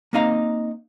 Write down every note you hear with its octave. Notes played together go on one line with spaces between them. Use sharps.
A#3 C4 D#4 D#5 F5 A#5